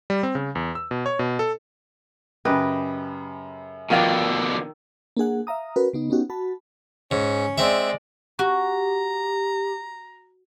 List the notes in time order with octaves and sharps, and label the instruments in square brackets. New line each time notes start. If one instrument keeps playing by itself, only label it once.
[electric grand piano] G3
C4
C#3
E2
E6
B2
C#5
B2
A4
[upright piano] F#2 C#3 [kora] G4 B4 D#5
[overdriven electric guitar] B2 D3 [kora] D#3 D5 [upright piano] F3 F5 E6
[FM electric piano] A#3 D4 G#4 F#5
E5 F5 A#5 D#6
C#4 F#4 A#4 B4
C#3 B3 D#4
B3 C#4 D#4 F#4 G4
F#4 A5 B5
[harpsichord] G#2 [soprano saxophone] C#4
[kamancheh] G#3 D5 [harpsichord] C4 E5
[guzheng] F#4 [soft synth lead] G4 [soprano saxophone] A#5